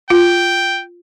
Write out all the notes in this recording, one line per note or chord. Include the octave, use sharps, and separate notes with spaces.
F4 G5